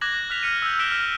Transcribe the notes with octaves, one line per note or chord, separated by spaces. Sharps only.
D6 F#6 G#6 A#6 F#7
F6 F#6 B6 F7
F6 C#7 D#7
E6 G6
F6 F#6 B6 D7 E7 G7
F6